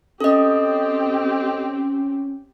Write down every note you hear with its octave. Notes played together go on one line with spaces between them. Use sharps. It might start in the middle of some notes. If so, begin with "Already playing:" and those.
C4 C#4 G4 A4 D#5